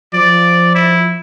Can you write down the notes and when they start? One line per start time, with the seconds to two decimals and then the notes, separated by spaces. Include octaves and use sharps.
0.14 F3 D5
0.75 E4